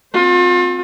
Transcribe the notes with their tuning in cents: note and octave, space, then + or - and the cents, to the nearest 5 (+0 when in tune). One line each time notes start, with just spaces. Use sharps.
C4 +0 F4 +40